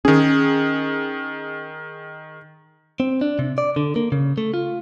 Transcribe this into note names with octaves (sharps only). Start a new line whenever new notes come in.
D#3 C#4 G#4
C4
D4
C3
D5
D3
A#3
C#3
A3
F4